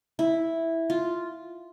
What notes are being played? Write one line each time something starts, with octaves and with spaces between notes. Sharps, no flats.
E4
F4